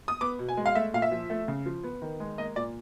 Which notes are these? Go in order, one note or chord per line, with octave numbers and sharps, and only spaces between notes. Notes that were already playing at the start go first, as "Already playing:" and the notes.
D#6
B3 D6
B2
G#5
G#3
F5
A3 E5
A#2 F5
E5
F3
A3
C#3
F3
B3
D#3
G#3
A#3 D#5
A#2 D5